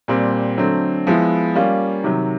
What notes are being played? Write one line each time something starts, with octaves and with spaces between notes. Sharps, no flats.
A#2 G3 C4
D3 F#3 A3 C4
F3 G#3 B3 E4
G3 A#3 C#4 F4
C3 D#3 F#3